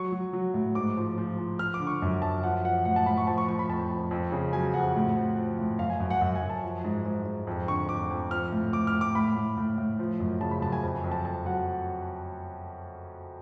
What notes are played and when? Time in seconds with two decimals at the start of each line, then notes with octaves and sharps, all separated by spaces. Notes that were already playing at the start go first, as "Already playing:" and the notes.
Already playing: F#3 C#6
0.12 F#3
0.33 F#3
0.54 A2
0.75 G#2 D6
0.97 F3
1.18 F3
1.38 F3
1.59 F3 F6
1.74 D6
1.80 D3
1.87 C#6
2.02 F#2
2.22 F#2 A5
2.43 F3 F#5
2.65 F3 F#5
2.85 A2 F#5
2.96 A5
3.06 A2 B5
3.17 C#6
3.27 F3 A5
3.38 C#6
3.48 F3 C#6
3.59 B5
3.69 F2 A5
3.90 F3
4.11 F2
4.32 C#3
4.53 F#3 G#5
4.74 F2 F#5
4.95 A2
5.17 F3
5.38 F3
5.59 A2
5.79 F#2 F5
5.90 G#5
6.00 F#2
6.10 F#5
6.21 F#2 F#5
6.35 G#5
6.43 F#2
6.49 A5
6.63 F3
6.84 G#2
7.05 G#2
7.26 G#2
7.47 F2
7.68 D3 C#6
7.89 F2 D6
8.10 F2
8.31 F3 F6
8.52 A2
8.73 A2 D6
8.87 F6
8.94 A2
9.01 D6
9.15 A2 B5
9.36 A2
9.57 A2
9.78 A2
9.99 F3
10.20 F#2
10.41 C#3 A5
10.51 B5
10.62 F#2 A5
10.72 G#5
10.83 F2
10.97 G#5
11.04 F2
11.12 A5
11.25 F2 A5
11.46 F#3 F#5